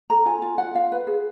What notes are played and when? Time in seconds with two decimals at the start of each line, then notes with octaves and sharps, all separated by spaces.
0.10 A4 A#5
0.26 F4 G#5
0.42 F4
0.58 F4 F#5
0.75 F4 F5
0.92 B4
1.07 G#4